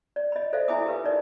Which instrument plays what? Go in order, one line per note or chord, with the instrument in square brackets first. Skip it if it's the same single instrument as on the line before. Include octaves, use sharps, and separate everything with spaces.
[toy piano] D5
D#5 B5
A4 C5 D5 E5 F5
E4 E5 G#5 B5 D6 D#6
G4 A#4 B4 F5
D#4 A4 D5 D#5